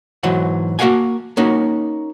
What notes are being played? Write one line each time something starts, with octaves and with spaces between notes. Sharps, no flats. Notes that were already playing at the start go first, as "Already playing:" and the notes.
G#2 E3 F#3 F#5
A#3 F#4 A#4 F5 F#5 G#5
A#3 C#4 D#4 F#4